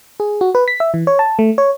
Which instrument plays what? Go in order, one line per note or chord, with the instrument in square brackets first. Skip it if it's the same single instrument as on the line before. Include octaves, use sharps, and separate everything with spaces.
[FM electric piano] G#4
F#4
B4
B6
E5
E3
C#5
A5
A3
C#5